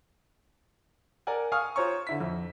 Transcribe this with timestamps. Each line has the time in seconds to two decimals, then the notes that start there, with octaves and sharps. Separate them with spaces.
1.27 A#4 D5 F#5 G#5
1.52 F5 G#5 C#6 D#6 F6
1.76 F4 C5 C#5 A#5 C#6
2.07 D3 E4 B6
2.20 F2